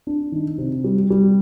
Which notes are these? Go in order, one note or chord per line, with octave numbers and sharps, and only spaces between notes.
D4
D#3
C3
G3
G3